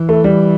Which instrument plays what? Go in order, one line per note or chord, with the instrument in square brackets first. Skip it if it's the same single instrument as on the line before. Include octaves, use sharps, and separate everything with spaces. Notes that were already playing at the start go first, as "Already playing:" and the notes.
Already playing: [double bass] E3
[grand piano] A3
G3